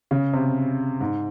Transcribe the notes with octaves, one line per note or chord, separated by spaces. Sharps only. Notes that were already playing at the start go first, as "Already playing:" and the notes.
C#3
C3
G#2